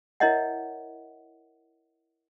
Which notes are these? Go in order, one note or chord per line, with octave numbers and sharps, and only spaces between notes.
E4 A#4 C#5 D#5 E5 F#5